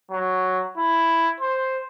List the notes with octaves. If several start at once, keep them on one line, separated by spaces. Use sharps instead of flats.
F#3
E4
C5